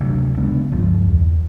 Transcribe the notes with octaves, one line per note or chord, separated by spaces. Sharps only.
D2 C3 F#3
C#3 G#3 B3 D4
C#2 G2 F3
E2